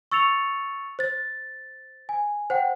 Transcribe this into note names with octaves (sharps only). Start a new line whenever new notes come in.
C#6 E6 A6 C#7 F7
C5 A6
G#5
C5 F#5 G5